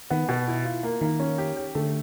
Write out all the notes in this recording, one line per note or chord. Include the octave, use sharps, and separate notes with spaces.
D#3 B3
B2
E4
F4
A#3
D#3 A#3
C#4
G4
G4
D3 A3